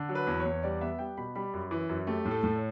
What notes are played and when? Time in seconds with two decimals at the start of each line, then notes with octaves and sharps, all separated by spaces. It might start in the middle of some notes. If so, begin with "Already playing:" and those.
Already playing: D3
0.09 F#3
0.15 B4
0.27 E2
0.40 C#5
0.45 E2
0.63 G3 D5
0.81 B3 E5
0.99 G3 G5
1.17 B2 B5
1.35 G3 B5
1.53 F#2
1.71 E3
1.89 F#2
2.07 A3 G4
2.25 A2
2.31 A4
2.43 A2
2.56 C#5